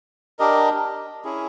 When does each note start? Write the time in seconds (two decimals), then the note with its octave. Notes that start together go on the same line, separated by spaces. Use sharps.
0.39 D4 G4 A#4 D#5
1.24 C#4 E4 G#4